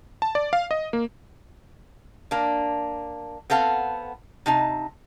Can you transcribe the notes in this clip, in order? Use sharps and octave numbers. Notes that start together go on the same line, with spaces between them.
A5
D5
F5
D#5
A#3
A#3 D4
B3 C4 A4 F5 F#5
C3 D#4 A5